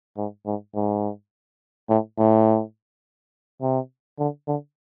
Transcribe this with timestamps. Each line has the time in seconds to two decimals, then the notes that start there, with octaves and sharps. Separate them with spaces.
0.17 G#2
0.46 G#2
0.75 G#2
1.90 A2
2.18 A2
3.62 C3
4.19 D3
4.47 D3